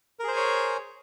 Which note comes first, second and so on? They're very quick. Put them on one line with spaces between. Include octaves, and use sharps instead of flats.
A#4 G#4 C5 G#5 C#5